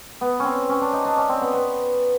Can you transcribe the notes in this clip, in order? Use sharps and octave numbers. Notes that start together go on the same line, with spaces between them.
B3
C4 C#4
C#4
D4
D#4
D4
C#4
C4
B3
B3